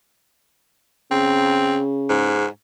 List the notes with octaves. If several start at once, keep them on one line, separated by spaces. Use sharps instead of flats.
C#3 C4
G#2